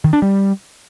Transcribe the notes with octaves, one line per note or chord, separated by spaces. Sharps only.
D#3
D4
G3